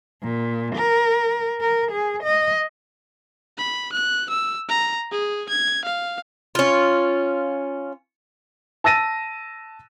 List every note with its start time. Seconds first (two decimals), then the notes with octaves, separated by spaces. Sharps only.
0.23 A#2
0.76 A#4
1.61 A#4
1.92 G#4
2.23 D#5
3.58 B5
3.93 F#6
4.30 E6
4.69 A#5
5.12 G#4
5.49 G#6
5.85 F5
6.55 C#4 F4
8.84 A5 E6 A6 A#6 D#7